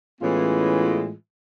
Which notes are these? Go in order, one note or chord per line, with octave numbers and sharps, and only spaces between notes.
A2 E3 G#3 B3 C#4 F4